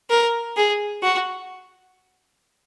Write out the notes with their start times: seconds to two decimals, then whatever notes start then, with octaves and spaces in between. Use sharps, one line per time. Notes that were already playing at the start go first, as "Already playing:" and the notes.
0.10 A#4
0.57 G#4
1.03 F#4